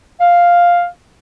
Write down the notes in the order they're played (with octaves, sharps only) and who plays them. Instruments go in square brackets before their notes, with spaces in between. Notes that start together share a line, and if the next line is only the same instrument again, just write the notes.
[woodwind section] F5